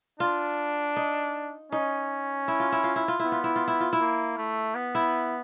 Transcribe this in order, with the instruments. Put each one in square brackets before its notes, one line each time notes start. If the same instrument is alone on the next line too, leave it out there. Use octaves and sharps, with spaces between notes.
[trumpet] D4 [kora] F4
[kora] D#4
[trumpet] C#4 [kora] D#4
[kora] E4
F4
E4
F4
E4
F4
[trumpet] B3 [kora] E4
[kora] F4
E4
F4
E4
F4
E4
[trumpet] A#3
A3
B3
[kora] E4